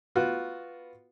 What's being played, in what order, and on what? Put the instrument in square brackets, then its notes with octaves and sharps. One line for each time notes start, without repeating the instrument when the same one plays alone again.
[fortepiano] B3 F4 F#4